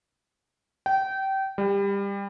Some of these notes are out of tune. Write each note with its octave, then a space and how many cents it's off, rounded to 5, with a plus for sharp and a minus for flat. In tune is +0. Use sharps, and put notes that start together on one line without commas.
G5 -25
G3 +25